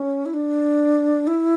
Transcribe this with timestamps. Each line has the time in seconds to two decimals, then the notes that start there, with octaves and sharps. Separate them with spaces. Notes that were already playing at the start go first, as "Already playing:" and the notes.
Already playing: C#4
0.26 E4
0.34 D4
1.27 E4